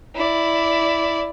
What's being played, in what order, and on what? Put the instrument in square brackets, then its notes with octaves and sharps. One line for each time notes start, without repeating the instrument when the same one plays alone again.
[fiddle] E4 D5